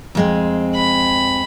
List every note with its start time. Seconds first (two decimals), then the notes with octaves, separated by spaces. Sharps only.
0.15 F2 G#3 C4
0.75 B5